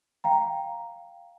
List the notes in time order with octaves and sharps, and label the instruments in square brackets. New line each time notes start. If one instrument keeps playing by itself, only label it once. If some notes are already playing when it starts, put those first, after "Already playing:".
[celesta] F5 G5 A#5